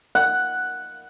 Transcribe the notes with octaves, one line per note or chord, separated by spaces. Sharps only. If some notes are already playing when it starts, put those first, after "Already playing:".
F#5